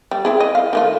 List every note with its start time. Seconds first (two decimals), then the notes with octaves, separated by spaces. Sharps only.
0.11 G3
0.25 C4 E4 G#4
0.40 D#5
0.55 F5
0.73 D#3 A3 F4